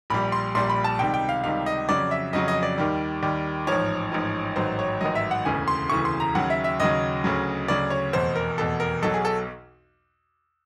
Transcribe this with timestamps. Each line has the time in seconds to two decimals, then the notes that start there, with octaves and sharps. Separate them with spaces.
0.10 A#1 A#2 G3 B5
0.32 C6
0.55 A#1 A#2 G3 C6
0.70 B5
0.84 A5
0.99 C#2 C3 D#3 G3 G5
1.14 G5
1.29 F5
1.44 C#2 C3 D#3 G3 F5
1.66 D#5
1.88 F2 C#3 F#3 D5
2.11 E5
2.33 F2 C#3 F#3 D#5
2.48 D#5
2.63 D5
2.78 D#2 D#3 G3
3.22 D#2 D#3 G3
3.67 A1 G#2 F3 C#5
4.12 A1 G#2 F3
4.56 A1 G#2 D#3 F#3 C5
4.79 C#5
5.01 A1 G#2 D#3 F#3 D#5
5.15 E5
5.31 F#5
5.45 E1 D2 C#3 E3 G#5
5.68 C6
5.90 E1 D2 C#3 E3 C#6
6.05 C6
6.20 A#5
6.35 D#2 C#3 F#3 F#5
6.50 E5
6.64 E5
6.80 D#2 C#3 F#3 D#5
7.24 D2 C#3 F#3
7.68 D2 C#3 F#3 D5
7.90 C#5
8.13 F1 E2 B2 C5
8.36 A#4
8.58 F1 E2 B2 A4
8.80 A#4
9.02 B1 B2 F#3 A4
9.14 G#4
9.25 A4